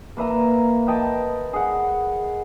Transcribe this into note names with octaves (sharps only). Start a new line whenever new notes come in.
A#3 B4 E5 A#5
B4 D#5 G5 A5
G#4 F#5